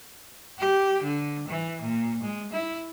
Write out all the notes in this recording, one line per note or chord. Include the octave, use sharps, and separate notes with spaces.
G4
D3
E3
A#2
G#3
E4